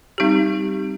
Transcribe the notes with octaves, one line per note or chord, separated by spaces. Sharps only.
G3 C4 D#4 G4